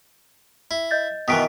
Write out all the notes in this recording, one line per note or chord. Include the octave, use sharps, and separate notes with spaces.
E4
D#5 G6 A6
B2 D#3 E3 D#6 B6 D7